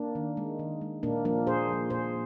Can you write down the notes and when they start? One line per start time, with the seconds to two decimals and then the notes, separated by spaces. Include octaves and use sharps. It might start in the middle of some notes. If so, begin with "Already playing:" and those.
Already playing: A#3 D4
0.15 D#3
0.37 G#3
0.59 D#3
0.81 G#3
1.03 A#2 A#3 D4
1.25 F3 A#3 D4
1.47 A#2 G#4 C5
1.69 F3 A#3
1.90 A#2 G#4 C5